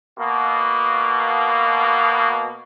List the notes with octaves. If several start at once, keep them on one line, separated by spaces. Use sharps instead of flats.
B2 A#3